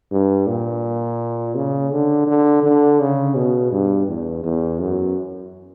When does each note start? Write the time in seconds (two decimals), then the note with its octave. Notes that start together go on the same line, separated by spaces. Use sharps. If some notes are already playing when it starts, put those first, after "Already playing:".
0.11 G2
0.47 A#2
1.55 C#3
1.92 D3
2.27 D3
2.63 D3
3.00 C#3
3.35 B2
3.72 G2
4.08 E2
4.44 E2
4.80 F#2